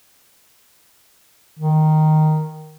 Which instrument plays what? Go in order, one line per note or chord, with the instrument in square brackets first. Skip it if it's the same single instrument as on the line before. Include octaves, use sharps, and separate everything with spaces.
[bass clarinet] D#3